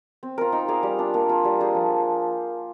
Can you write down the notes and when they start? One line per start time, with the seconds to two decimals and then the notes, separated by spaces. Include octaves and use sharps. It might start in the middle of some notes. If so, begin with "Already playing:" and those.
0.23 C4
0.38 F4 A#4
0.53 D#4
0.68 G#4 D5 F5
0.83 G3
0.99 D4 F4
1.14 A#3
1.29 F4 G#4
1.45 G3
1.60 D4 G#4 C5
1.75 F3